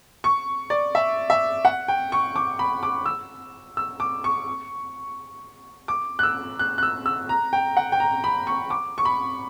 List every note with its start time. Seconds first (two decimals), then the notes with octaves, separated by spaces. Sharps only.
0.24 C#6
0.70 D5
0.95 E5
1.30 E5
1.65 F#5
1.88 G5
2.12 C#6
2.36 D6
2.59 B5
2.83 D6
3.06 E6
3.77 E6
4.00 D6
4.24 C#6
5.88 D6
6.19 F#6
6.23 E6
6.59 F#6
6.78 F#6
6.83 E6
7.06 E6
7.29 A#5
7.53 G5
7.77 F#5
7.92 G5
8.00 A#5
8.24 B5
8.47 C#6
8.70 D6
8.98 C#6
9.05 B5